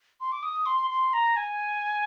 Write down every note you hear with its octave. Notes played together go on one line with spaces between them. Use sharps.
C6
D6
D#6
C6
C6
A#5
G#5